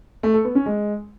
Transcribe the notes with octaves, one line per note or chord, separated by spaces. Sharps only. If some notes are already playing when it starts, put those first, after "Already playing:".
A3
A4
B3
C#4
G#3